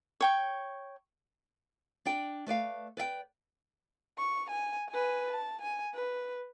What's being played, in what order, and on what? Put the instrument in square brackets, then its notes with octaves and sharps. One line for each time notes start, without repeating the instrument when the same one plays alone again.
[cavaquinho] C#5 G5 C#6
[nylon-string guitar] D4 D5 G5
A3 B4 D5 F5
B4 D5 E5 G5
[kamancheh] C#6
G#5
B4 G#5
A5
G#5
B4